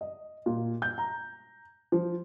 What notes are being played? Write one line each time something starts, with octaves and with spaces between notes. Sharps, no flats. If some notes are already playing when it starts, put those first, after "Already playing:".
D#5
A#2
G6
A#5
F3